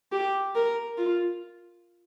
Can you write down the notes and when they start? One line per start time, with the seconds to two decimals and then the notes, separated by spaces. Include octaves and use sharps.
0.12 G4
0.55 A#4
0.98 F4